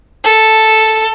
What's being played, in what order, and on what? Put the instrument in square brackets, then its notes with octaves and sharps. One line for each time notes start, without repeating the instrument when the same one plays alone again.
[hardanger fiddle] A4